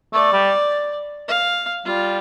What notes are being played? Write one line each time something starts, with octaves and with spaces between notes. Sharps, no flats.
A3 D5
G3
F5
G3 F4